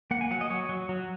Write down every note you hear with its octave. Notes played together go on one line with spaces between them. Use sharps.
A#3 F#5
G#5
F#3 F#5
D#5
F#3 C#5
F#3
F#3